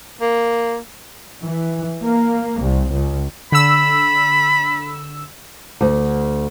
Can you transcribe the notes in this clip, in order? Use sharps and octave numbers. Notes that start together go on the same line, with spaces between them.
A#3
E3
A#3
C2
C#2
D3 B5 E6
D2